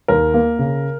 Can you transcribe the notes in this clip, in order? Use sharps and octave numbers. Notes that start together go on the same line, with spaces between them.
D#2 A#4
A#3
C#3